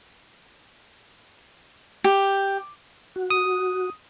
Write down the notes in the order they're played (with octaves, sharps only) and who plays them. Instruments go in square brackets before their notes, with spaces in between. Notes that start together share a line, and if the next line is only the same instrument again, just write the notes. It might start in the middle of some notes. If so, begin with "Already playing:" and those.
[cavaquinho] G4
[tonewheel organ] F#4
[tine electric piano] D#6